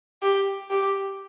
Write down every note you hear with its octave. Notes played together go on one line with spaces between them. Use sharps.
G4
G4